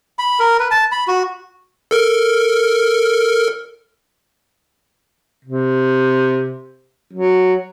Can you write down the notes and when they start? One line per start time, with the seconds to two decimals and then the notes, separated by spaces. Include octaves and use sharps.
0.19 B5
0.40 A#4
0.60 B4
0.71 A5
0.92 B5
1.08 F#4
1.91 A4 A#4 F6
5.45 C3
7.13 F#3